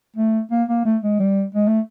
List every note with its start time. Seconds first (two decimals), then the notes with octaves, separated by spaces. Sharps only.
0.16 A3
0.51 A#3
0.69 A#3
0.85 A3
1.03 G#3
1.20 G3
1.55 G#3
1.68 A3